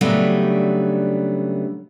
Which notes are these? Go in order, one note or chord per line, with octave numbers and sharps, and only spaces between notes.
C#3 F#3 G3 A3 B3 D4